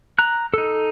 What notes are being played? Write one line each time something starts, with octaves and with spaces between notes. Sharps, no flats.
A#5 F#6
D#4 A4